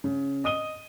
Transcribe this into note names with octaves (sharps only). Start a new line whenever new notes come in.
C#3
D#5 D#6 D#7 G7